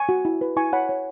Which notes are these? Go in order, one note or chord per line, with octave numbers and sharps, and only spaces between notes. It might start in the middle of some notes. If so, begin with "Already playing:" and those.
Already playing: G#5 C#6
F#4
E4
B4
E4 G#5 C#6
C#5 F#5 B5
C#5